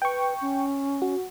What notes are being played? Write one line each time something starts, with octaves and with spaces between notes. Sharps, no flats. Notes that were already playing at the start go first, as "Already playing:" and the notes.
B4 G5 C#6
C#4
F#4